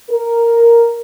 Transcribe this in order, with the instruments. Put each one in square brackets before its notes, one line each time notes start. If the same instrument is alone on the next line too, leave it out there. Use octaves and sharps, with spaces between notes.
[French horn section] A#4